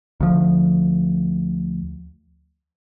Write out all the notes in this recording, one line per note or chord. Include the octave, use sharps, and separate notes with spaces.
D2 F3